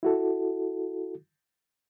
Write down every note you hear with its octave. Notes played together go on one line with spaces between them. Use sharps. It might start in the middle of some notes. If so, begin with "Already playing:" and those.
E4 F#4 A4